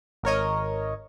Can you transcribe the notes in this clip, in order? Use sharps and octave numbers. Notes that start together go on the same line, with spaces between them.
G#1 A#4 C#5 D#5